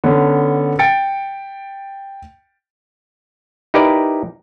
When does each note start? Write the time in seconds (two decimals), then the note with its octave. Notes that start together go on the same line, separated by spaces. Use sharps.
0.04 D3 B3 C#4
0.79 G5 A6 C#7 D7
3.74 D#4 E4 G4 A#4 B4 D5